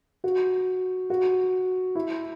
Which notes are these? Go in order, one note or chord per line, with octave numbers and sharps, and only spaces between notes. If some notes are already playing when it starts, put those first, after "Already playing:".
F#4
F#4
E4